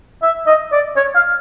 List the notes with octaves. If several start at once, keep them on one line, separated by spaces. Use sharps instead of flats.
E5
D#5
D5
C#5
F5